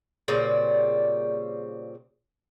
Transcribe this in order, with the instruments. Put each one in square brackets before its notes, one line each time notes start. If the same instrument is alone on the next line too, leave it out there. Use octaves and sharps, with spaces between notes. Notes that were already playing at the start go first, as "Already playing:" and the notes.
[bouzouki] A#2 C#3 G3 C4